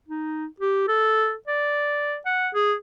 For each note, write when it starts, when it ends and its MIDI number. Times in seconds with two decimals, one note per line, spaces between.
0.08 0.46 63
0.60 0.85 67
0.88 1.34 69
1.48 2.17 74
2.26 2.49 78
2.54 2.75 68